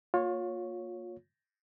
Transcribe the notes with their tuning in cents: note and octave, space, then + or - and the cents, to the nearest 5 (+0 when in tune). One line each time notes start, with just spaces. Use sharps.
A#3 +0 F4 +30 C#5 +0